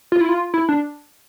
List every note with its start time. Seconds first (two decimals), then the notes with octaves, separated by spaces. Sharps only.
0.12 F4
0.21 E4
0.29 F4
0.54 E4
0.69 D4